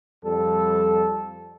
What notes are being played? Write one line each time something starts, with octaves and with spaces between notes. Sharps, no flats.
F2 G3 A4